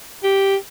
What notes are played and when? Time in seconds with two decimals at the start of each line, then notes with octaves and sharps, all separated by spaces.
0.23 G4